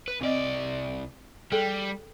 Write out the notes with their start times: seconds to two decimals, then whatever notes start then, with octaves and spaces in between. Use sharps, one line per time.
0.08 B4
0.21 C2 C4 D5 D#5
1.52 G3 G#4 A4 G5